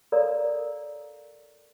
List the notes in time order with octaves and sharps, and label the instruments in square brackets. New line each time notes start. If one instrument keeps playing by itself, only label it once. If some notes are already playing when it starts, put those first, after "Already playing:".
[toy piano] A4 A#4 C#5 D5 F5 A#5